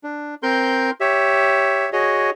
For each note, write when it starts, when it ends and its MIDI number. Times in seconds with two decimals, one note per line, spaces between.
0.04 0.35 62
0.43 0.90 60
0.43 0.90 70
0.43 0.90 84
0.43 0.90 91
1.01 1.90 67
1.01 1.90 73
1.01 1.90 76
1.93 2.30 66
1.93 2.30 68
1.93 2.30 73
1.93 2.30 75